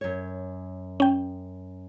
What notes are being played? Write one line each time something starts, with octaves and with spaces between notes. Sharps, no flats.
F#2 C#5
C#4 G5